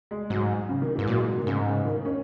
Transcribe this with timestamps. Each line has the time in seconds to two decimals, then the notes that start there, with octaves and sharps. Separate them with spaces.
0.11 G#3
0.30 G#2 F#3
0.69 C#3
0.82 D#3
0.95 G#2 E3
1.08 A#2 F#3
1.18 G#3
1.27 F#3
1.37 D#3
1.47 G#2 C#3
1.66 C#3
1.85 D#3
2.05 C#4